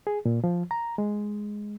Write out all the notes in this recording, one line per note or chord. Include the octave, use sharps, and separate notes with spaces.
G#4
A#2
F3
A#5
G#3